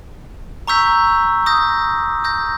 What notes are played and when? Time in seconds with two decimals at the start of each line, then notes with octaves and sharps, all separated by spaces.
0.67 A#5 C#6 E6 G6 B6
1.46 D#6 G6 A#6
2.24 D#6 G6 A#6